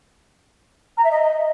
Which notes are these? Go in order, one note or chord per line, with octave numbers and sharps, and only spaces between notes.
A#5
E5
D#5